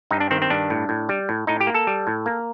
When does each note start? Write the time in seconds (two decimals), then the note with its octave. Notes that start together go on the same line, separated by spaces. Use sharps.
0.11 G2 D#4
0.20 D4
0.31 D#3 C4
0.42 C4
0.50 G2 D4
0.70 A2
0.89 A2
1.09 G3
1.29 A2
1.47 A2 D#4
1.60 G4
1.67 A#3
1.74 A4
1.87 G3
2.07 A2
2.26 A#3